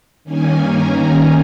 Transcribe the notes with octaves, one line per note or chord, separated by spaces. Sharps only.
G2 D#3 A#3 C#4 G#5
A#5
A#5